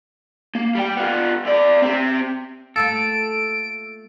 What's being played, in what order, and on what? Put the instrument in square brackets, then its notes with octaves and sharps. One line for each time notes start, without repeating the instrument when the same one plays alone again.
[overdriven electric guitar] A#3
G3 G5
B3 F4
E3 D5
C4 G4
[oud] A3 A#3 F4 [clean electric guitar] A4 [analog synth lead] D7